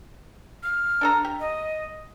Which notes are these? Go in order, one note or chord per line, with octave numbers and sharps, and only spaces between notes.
F6
D4 A4 A#5
G4
D#5